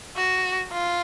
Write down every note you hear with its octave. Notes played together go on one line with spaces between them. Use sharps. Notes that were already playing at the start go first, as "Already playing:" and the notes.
F#4
F4